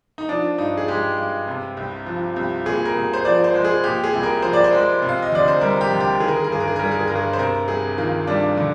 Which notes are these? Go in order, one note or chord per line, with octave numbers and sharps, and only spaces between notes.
D#4
F3 D4
G2 D#4
G#4
G#3 G4
G2
C3
C2
F3
C2
A#2 G#4
A#4
C2
C5
F3 D5
C5
G#3
G#4
A#2 G4
G#4
C2
A#4
F3 C5
D5
C5
G#3
C3
F5
D#5
D2 D5
C5
G3 A#4
G4
D2
G4
D#3 G#4
A#4
G#4
A#4
G2 G#4
A#4
G#4
A#4
G3 G#4
A#4
G#4
G2 A#4
G#4
C5
C3 A#4
C2 G#4
D#3 F4
G3 D4
D3